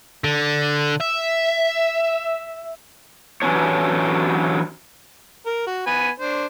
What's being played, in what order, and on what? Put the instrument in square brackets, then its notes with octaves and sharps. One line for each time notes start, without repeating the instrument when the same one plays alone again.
[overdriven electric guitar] D3
E5
[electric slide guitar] E3 F#3 C#4 D4 C#5
[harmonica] A#4
F#4
B3 G#5 B5
D4 C5